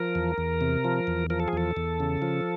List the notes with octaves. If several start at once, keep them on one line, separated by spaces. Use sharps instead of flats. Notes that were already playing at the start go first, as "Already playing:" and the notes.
Already playing: F3 A#4
E2
E2
C3
F3
E2
F3 A#4
A4
G#4
E2 A4
E2
C#3
F3